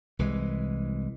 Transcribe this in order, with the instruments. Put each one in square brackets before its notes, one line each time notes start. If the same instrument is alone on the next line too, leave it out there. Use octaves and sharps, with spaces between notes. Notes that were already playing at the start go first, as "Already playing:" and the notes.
[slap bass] C2 E3 G#3